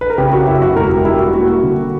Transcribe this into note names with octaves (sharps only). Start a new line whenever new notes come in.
B4
A#4
C#3 G4
F#4
F#2 E4
F#4
E1 A#4
G4
G3 E4
F#4
A#3 F#4
D3